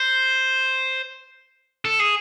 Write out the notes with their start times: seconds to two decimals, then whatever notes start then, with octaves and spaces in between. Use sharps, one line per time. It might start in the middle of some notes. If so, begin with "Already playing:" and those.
Already playing: C5
1.85 A4
2.00 G#4